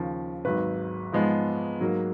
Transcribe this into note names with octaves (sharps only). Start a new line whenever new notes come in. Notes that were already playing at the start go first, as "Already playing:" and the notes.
Already playing: D#2 C#3 F3
G#1 G#2 F#3 B4
G#2 F3 G#3 B3
G#2 F#3 A#3